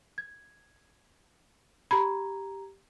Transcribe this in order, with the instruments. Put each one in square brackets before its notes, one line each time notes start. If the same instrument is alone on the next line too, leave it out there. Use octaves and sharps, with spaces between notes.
[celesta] G#6
[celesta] G4 A#5 G#6 [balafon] B5